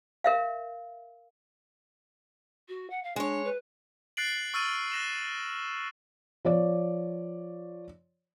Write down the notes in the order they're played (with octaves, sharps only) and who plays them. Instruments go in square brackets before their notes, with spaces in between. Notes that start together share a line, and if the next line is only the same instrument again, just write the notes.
[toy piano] A#4 E5 F5
[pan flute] F#4
F#5
F5
[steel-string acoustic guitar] G#3 C#5 [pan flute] D4
[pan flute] B4
[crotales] F#6 A6 C7 D7 F#7
C#6 E6 F6 A6 D#7
F#6 A#6 E7
[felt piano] F3 C#5 D5